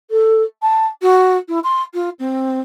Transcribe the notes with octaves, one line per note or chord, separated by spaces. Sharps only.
A4
A5
F#4
E4
C6
F4
C4